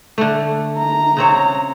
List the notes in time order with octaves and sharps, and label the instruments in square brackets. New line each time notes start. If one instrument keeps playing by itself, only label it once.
[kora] D3 A3
[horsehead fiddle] A#5
[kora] C#3 C4 C#5